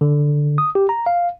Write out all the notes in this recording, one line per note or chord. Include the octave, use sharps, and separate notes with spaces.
D3
D#6
G4
A#5
F5